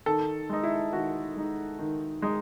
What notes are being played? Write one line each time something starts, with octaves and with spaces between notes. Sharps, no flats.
D#3 A4
G#3 D#4
E4
D#3 F#4
G#3 D#4
D#3
G#3 D#4